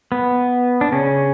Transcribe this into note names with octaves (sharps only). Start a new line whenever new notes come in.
B3
D4
C#3 C#4